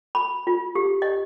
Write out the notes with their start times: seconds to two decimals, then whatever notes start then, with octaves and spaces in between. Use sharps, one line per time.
0.15 B5
0.47 F4
0.75 G4
1.02 D#5